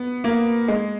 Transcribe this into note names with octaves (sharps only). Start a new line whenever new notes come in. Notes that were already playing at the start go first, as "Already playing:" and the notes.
Already playing: B3
A#3
G#3